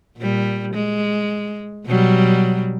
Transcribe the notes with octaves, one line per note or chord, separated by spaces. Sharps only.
A#2 G3
G#3
B2 F#3 G3